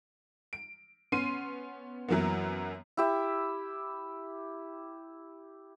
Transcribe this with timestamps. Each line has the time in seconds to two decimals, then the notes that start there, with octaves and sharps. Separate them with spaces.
0.53 D7
1.12 B3 C#4 C6 C7 D#7
2.09 F#2 E3 F#3 A#3 B3
2.97 E4 G4 E5